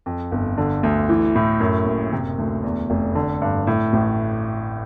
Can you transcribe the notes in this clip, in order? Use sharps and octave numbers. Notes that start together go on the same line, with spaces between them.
F2
G1
D3
D2
E3
A2
F#2
F#1
C3
D2
E2
F1
D3
G2
A2
A1